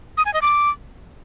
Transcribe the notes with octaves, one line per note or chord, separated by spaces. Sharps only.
D#6
G#5
D#5
D6